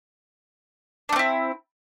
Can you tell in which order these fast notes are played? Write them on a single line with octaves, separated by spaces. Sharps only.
D4 A3 C4 E4